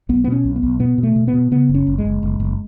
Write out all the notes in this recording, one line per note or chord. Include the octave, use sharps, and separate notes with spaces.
B1 B3
B3
B2 C#4
B1
B3
B1
B2 B3
B2
A3
B2
B3
B2
C#3 B3
F#1
C#4
F#1
G#3
F#1
F#1
F#1